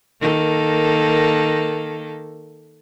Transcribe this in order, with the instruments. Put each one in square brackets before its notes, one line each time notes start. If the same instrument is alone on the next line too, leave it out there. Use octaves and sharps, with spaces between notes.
[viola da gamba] D#3 A#3 A4